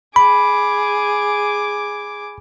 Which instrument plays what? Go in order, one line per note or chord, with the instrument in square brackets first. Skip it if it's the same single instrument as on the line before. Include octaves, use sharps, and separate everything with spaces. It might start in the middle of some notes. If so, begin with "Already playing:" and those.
[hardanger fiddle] G#4 D6 [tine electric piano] B5